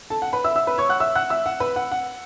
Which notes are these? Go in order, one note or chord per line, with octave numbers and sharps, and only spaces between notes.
A4 A5
F#5
B4 B5
E5 E6
E5 E6
B4 B5
C#5 C#6
F#5 F#6
E5 E6
F#5 F#6
E5 E6
F#5
B4 B5
F#5
F#5